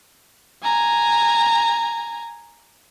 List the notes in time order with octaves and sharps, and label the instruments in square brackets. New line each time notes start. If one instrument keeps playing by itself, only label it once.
[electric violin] G#5 A#5